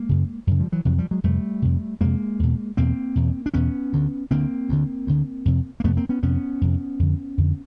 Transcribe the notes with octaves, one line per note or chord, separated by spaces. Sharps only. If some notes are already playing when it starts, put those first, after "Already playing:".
Already playing: G#3 A#3
F#2 C#3
F#2 C#3
F3 G3
E3 F#3
F2 C3 E3 F#3
F3 G3
F#3 G#3
F2 C3 G3 A3
F2 C3
F2 C3 G#3 A#3
E2 B2
E2 B2 A#3 C4
E2 B2
D4
E2 B2 B3 C#4
D2 D3
D2 D3 A#3 C4
D2 D3
D2 D3
F2 C3
A#3
F2 C3 A3 B3
A#3 C4
B3 C#4
F2 C3 B3 C#4
F2 C3
F2 D3
F2 D3